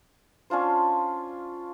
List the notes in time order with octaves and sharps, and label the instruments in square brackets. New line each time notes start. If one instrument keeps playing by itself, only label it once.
[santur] C#4 D4 F4 C5